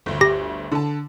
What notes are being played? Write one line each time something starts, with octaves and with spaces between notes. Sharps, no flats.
G1 D2
G4 A#6
D3 A5